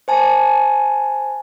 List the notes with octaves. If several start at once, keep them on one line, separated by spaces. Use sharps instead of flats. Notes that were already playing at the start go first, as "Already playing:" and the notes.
C5 G#5 A5